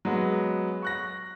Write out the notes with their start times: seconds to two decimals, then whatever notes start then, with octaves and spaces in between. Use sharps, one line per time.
0.05 F#3 G#3 B3
0.82 C#6 F#6 A#6